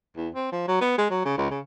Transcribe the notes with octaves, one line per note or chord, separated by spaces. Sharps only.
E2
C4
F3
F#3
B3
G#3
F#3
C#3
C#2
C#3